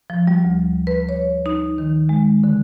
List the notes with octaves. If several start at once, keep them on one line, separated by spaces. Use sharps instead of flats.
F3
G3
D2
B4
C#5
D#4
D#3
G#3
D3